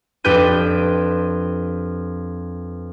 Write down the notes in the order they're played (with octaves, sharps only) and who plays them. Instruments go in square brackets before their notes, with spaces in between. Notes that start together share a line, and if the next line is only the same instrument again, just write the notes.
[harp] F2 D4 G4 B4 G6 D#7